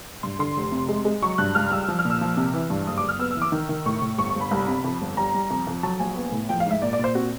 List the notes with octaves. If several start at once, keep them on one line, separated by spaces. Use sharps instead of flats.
G2 C6
D3 C6
F1
C3
G#3
G#3
F#3 C#6
G2 F#6
C#2 F6
G3 E6
F3
F6
A#2
E6
F3
C3
E3
G2
F#1 D#6
D6
F#1
F6
B3 E6
E6
E3
D6
D#3
D#3
A2 C#6
A2
G1 C#6
C#6
G1
B5
C2
C3
F2
G1
G3 A#5
G3
F2
F2
F#3 A5
A#1 G#5
B3
A2
F3 G5
F5
G#2 E5
A#2 D5
D5
A#2 C5
C4 F#4